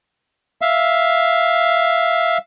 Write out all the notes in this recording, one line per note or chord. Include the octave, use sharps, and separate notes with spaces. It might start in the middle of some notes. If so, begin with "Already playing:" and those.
E5 F5